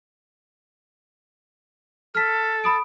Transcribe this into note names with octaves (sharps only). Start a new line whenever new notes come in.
A4 F6 B6
B5 D#6 D7